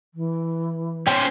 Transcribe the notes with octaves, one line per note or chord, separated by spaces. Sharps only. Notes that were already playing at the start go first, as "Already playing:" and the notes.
E3
C#4 C5 G5